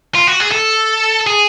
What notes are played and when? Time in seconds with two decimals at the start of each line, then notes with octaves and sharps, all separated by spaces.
0.15 F4
0.27 F#4
0.40 G#4
0.51 A4
1.27 G#4